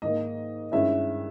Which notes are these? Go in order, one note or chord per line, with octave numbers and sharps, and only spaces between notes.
G#2 D#3 A#3 D#5
G2 D#3 G#3 C#4 E4 E5